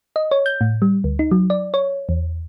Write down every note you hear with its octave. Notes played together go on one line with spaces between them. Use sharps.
D#5
C#5
G6
A2
G3
D2
D#4
F#3
D5
C#5
E2